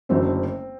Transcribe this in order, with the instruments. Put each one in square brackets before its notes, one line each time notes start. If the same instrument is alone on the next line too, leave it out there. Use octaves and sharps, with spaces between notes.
[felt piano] F#1 F#2 D3 F#3 A3 [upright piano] C4